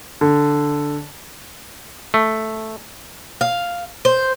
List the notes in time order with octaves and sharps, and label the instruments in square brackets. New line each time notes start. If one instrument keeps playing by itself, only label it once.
[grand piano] D3
[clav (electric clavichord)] A3
[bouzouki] F5
C5